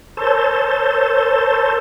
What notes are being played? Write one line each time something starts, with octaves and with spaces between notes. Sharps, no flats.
A#4 C5 C#5 A5 E6 G6